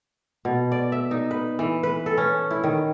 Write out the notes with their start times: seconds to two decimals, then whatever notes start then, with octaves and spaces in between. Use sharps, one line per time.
0.45 B2
0.72 D5
0.92 E5
1.11 D#4
1.31 B4
1.59 E3
1.83 B4
2.06 A4
2.18 C#4
2.51 E4
2.64 D#3